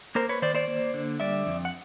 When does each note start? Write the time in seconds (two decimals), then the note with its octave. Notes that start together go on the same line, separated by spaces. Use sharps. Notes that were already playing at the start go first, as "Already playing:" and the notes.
0.15 A#3 A#4 C5
0.29 B4 C#5
0.42 D#3 C5 D5
0.55 C5 D5
0.68 A#3
0.94 D3
1.20 G3 D5 E5
1.46 F2
1.65 F#5